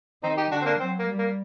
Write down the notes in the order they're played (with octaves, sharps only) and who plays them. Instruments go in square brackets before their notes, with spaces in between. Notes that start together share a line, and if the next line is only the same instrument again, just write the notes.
[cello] D#3 [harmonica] C4 D#4
[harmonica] D#4 G4
[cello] D3 [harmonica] D4 F#4
[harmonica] C4
A#3 D4
[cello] F#3 [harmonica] C4
[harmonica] A#3
[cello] G3
[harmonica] A#3